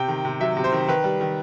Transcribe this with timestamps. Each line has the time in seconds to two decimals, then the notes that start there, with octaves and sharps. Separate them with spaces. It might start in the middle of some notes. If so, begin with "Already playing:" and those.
Already playing: C3 G5
0.08 D#3
0.25 C3
0.40 F#3 E5
0.57 C3
0.64 C5
0.72 D#3
0.88 D#3 B4
1.04 G3
1.21 D#3